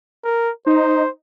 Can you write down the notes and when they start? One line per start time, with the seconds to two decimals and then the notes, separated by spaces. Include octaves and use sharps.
0.24 A#4
0.66 D#4 C5